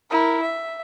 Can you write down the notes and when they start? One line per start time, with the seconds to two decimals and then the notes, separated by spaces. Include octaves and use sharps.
0.10 E4 A#4
0.42 E5